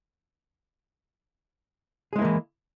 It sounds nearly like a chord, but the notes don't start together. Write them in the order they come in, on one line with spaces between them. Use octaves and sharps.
G#4 G#3 E4 A#3 E3